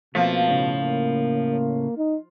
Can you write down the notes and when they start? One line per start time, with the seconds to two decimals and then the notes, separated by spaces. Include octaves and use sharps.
0.15 B2 F3 A3 A#3 C4
0.48 A2 C#3
0.80 A#3
1.97 D#4